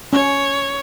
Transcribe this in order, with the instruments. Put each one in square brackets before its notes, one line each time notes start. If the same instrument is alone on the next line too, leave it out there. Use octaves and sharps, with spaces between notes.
[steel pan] C#4 [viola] C#5